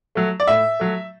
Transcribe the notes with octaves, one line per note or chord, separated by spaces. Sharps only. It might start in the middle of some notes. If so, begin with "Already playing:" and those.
F#3 A3
D5
A2 E5
F#3 A3